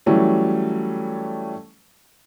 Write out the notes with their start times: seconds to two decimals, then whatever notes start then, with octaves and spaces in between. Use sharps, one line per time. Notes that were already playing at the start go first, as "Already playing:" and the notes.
0.06 E3 F#3 G3 A3 C#4